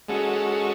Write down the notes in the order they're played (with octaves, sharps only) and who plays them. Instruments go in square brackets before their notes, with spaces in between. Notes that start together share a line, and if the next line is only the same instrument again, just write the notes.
[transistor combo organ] G#3 C#4 F#4 A4